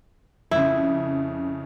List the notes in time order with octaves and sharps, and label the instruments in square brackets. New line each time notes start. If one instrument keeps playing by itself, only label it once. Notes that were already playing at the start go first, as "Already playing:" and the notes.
[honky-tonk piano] F2 C#3 [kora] E4